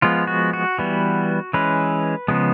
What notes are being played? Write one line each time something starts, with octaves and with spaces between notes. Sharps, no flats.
F3 G#3 B3 F4
F#4
F#4
E3 G3 B3
E3 G#3 C#4 B4
C#3 F3 G#3 B3